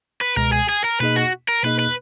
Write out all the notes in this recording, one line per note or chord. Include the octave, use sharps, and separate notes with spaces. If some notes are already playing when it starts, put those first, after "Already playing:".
B4
C#2 B2 G#3 A#4
G#4
G#4
A#4
B2 A#3 D#4 G#4 B4 D#5
F#4
A#4
B2 A#3 D#4 G#4 B4 D#5
B4